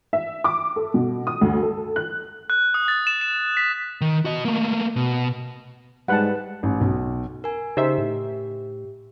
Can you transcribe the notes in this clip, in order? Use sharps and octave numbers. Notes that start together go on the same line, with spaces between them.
E5
D6
A4
B2
D#6
D2
A4
F#6
F#6
D#6
A6
E7
E7
B6
D#3
F#4 D#5
A3 A#3
B2
G#2 G3 G#3 B4 F#5 A5 F#6
A1
B1
A#4 G#5
C#3 D#4 G4 C5 E5
A2